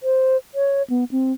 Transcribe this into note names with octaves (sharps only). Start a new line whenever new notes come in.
C5
C#5
B3
C4